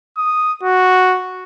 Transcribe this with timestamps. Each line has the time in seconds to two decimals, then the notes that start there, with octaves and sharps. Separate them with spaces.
0.17 D#6
0.63 F#4